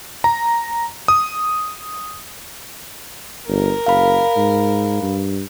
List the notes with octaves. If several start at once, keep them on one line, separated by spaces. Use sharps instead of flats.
A#5
D#6
G1 A#4
F#1 F5 B5
G#2
G2